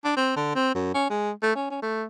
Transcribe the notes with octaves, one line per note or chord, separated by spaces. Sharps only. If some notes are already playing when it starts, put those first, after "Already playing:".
D4
C4
D3
C4
F#2
C#4
G#3
A3
C#4
C#4
A3